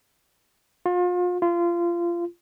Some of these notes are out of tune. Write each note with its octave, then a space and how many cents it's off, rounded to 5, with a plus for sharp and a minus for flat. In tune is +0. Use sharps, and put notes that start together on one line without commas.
F4 +35
F4 -25